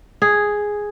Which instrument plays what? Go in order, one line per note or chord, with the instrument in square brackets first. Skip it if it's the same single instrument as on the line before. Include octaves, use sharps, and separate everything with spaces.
[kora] G#4